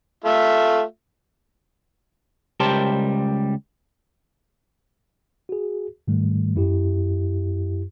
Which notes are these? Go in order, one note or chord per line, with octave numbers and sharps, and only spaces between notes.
A3 F4 E5
C#2 G3 G4 A#4 C5 A5
F#4 G#4
G#2 D#3 G3 A3
F#2 E4 G4